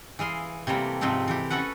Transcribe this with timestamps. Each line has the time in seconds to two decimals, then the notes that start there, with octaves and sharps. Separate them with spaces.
0.19 E3 G#4 F5 C6
0.67 C3 E3 G3 A3 A#3
1.01 G#2 C3 F3 A3 C4
1.28 E3 G4
1.50 C#4 F#4 A4 B4 F#5